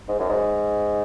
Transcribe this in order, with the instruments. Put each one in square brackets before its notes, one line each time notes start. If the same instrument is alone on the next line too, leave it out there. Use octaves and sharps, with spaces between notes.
[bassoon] G#2
F#2
G#2